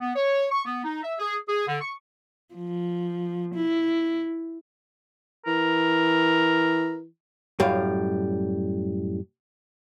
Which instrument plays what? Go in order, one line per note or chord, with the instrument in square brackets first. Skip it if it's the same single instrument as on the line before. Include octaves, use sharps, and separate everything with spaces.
[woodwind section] B3
C#5
C#6
B3
D#4
E5
G#4
G#4
D3
C#6
[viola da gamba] F3
E4
[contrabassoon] E3 [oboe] A#4
[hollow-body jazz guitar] F#2 A2 G3 F5